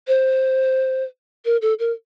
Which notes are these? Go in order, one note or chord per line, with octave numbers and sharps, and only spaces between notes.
C5
A#4
A4
A#4